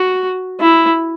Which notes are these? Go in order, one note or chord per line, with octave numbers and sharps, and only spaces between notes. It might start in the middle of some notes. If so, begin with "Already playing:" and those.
Already playing: F#4
E4